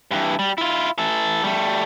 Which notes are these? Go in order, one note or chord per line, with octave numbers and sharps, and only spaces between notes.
G2 E3
G3
E4 F4
E3 A4
G3 A3